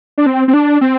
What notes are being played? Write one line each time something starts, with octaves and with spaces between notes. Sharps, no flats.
D4
C4
C4
D4
C4